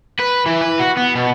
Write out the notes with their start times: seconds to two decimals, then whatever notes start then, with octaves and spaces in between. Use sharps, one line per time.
0.20 B4
0.46 E3
0.61 B4
0.80 F#4
0.97 B3
1.16 B2